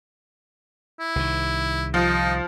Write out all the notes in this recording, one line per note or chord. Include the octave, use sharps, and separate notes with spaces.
E4
C2 D#3
F3 D#4